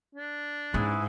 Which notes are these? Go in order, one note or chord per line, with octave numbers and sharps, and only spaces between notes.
D4
G#2 C#4 E4 G#4 B4